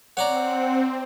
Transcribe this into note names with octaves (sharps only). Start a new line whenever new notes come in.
C4 C#5 D5 F#5 A#5